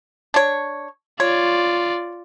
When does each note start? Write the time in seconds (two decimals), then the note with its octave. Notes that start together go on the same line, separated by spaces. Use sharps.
0.34 D4 C#5
1.20 F4 C#5 D5